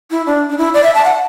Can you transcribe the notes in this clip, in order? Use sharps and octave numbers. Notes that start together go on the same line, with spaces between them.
E4
D4
D4
E4
D5
E5
A5
F#5